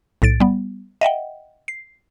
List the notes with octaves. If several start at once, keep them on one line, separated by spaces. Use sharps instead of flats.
B1 A2 A6 D7
G3 B3
D#5 E5 F#5 G5
C7